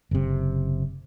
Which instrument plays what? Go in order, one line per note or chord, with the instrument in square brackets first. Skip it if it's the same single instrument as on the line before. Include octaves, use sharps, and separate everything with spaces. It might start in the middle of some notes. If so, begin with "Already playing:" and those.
[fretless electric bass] F#1 C3